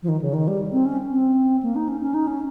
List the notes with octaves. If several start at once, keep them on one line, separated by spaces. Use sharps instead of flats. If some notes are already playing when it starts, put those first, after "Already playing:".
F3
D#3
C#3
D#3
G3
C4
C#4
C4
A#3
D#4
C#4
C#4
D#4
C#4